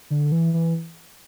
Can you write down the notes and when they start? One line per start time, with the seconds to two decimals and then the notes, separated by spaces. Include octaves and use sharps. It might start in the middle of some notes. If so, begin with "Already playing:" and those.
0.10 D3
0.32 E3
0.54 E3